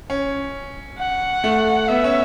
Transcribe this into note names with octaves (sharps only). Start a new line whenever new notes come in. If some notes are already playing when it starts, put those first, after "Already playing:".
C#4
F#5
A3
B3 E5
C#4